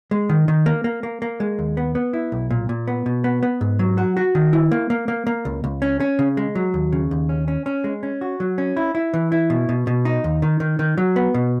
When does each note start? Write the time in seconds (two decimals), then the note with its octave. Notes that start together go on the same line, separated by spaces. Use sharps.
0.11 G#3
0.29 D#3
0.48 D#3
0.66 A#3
0.84 A#3
1.03 A#3
1.22 A#3
1.40 G#3
1.59 D#2
1.77 B3
1.95 B3
2.13 E4
2.32 B1
2.50 A#2
2.69 A#2
2.88 B3
3.06 B2
3.24 B3
3.43 B3
3.61 G#2
3.79 F#3
3.98 F#4
4.17 F#4
4.35 D#3
4.53 E4
4.71 A#3
4.90 A#3
5.08 A#3
5.27 A#3
5.45 C#2
5.64 C#2
5.82 C#4
6.00 C#4
6.19 C#3
6.37 G#3
6.55 F#3
6.74 D#2
6.92 C#3
7.11 D#2
7.29 C#4
7.48 C#4
7.66 C#4
7.84 G#3
8.03 C#4
8.21 F#4
8.40 F#3
8.58 C#4
8.77 E4
8.95 E4
9.14 E3
9.32 E4
9.50 B2
9.69 B2
9.87 B2
10.05 D#4
10.24 D#2
10.42 D#3
10.60 D#3
10.79 D#3
10.98 F#3
11.16 B3
11.34 B2